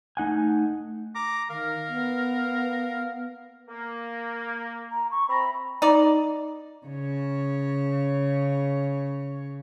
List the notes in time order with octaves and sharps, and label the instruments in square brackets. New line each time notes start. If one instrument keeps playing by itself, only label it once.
[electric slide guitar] A3 D#4 F#5 G#5
[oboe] A#5 [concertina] D6
[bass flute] D#3 [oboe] A#4 [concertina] F5
[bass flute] B3
[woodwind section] A#3
[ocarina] A#5
C#6
[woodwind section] C4 E5 A#5 [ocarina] B5
[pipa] D#4 D5
[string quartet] C#3 C#5